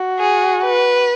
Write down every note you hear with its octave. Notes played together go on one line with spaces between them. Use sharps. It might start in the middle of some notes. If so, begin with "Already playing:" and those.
Already playing: F#4
G#4
B4